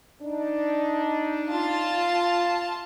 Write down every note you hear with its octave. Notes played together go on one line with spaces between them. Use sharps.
D4 D#4
F4 A5